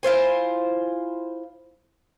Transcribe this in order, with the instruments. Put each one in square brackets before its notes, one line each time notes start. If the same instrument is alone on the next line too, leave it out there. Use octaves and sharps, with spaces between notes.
[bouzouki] E4 F4 C5 G#5